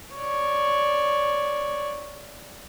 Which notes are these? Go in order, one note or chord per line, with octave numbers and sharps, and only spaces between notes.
C#5 D5